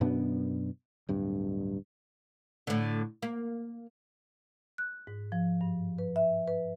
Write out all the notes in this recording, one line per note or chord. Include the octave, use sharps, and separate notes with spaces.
F#2 B2 B3 D4
D1 G2
A2 D3
A#3
F#6
G#2
F3
G2
B4
E5
B4